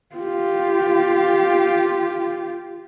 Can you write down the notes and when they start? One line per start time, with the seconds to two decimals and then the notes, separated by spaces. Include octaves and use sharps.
0.16 F4 G4